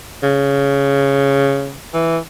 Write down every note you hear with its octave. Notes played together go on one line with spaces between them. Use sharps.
C#3
E3